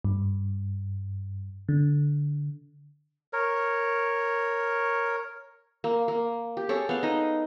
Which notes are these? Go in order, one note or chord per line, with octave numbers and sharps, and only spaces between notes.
G2
D3
A#4 C#5
A#3
A#3
G4
G#4 A4 C#5
B3 F5
D#4 D#5